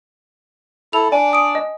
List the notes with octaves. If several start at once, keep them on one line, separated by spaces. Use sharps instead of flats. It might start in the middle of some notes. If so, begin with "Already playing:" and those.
E4 A4 F7
D4 D5 G#5
G#5 D#6 D7
D#5